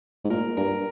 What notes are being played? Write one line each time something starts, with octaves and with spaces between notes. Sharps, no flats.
G#2
A#2 A#4
G2 A#4